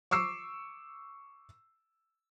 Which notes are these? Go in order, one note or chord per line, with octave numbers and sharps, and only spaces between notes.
C#6 D6 E6 C7